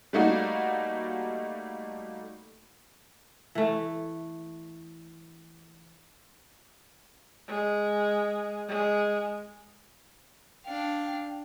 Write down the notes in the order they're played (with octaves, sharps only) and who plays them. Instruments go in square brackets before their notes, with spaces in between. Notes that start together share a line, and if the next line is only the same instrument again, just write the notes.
[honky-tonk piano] G3 A3 A#3 D#4 F#4
[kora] E3 A3
[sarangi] G#3
G#3
[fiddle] D4 F5 [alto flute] G5